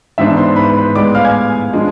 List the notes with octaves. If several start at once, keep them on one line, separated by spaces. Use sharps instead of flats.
G#2 E3 B3 D4 E5 E6
C5 C6
B4 B5
B4 B5
A2 G#3 B3 D5 D6
F5 F6
G#5 G#6
F3 G#3 D4